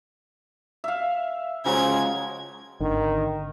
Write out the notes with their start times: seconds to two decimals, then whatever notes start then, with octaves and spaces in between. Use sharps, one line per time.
0.84 E5 F5
1.66 C#3 F3 F#3 G#3 G#6
2.80 G#1 D3 D#3